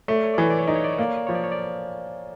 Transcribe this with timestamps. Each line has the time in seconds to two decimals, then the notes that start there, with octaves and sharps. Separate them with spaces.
0.08 A3 C#5
0.16 D5
0.24 C#5
0.34 D5
0.38 E3 C#5
0.50 D5
0.59 C#5
0.67 D#4 D5
0.76 C#5
0.84 D5
0.93 C#5
0.99 A#3 D5
1.09 C#5
1.17 D5
1.27 F3 C#5
1.35 D5
1.44 C#5
1.52 D5